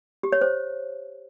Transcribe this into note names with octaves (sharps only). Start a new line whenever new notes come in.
G4
C#5
C5